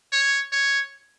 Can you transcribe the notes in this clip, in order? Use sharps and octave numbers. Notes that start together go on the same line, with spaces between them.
C#5
C#5